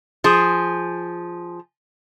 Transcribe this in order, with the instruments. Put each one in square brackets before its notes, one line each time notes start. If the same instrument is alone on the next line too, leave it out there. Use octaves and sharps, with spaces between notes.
[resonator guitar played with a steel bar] F3 G#4